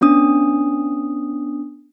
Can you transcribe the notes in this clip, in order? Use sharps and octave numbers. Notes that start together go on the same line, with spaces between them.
B3 C#4 D4 D#6